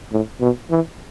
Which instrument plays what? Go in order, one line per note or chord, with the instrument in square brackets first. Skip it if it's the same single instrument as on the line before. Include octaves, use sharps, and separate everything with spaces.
[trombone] A2
B2
E3